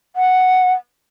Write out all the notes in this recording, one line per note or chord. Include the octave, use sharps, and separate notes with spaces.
F#5